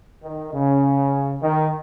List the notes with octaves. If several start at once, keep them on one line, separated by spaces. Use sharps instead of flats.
D#3
C#3
D#3